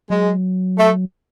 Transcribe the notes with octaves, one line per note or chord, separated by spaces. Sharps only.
F#3 G#3
A3